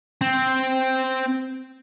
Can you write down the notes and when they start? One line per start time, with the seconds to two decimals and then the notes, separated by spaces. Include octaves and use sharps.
0.21 C4